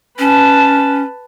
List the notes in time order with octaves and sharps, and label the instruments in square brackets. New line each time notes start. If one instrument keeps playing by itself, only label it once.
[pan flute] C#4 [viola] B4 A5